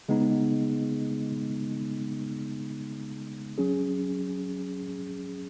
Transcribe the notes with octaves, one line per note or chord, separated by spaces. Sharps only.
C#3 G#3 B3 D#4
F#3 C#4 G#4